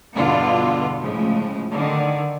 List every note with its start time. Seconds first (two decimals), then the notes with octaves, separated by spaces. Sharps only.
0.14 E2 G2 B2 D3 B3 F4
1.01 A2 C#3 F3 G#3
1.71 D3 D#3